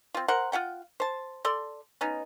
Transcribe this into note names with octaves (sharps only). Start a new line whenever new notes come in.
C4 F4
A#4 C5 F#5
F4 G4 F#5 G5
C5 A5
A4 D5 C6
B3 C#4 D#4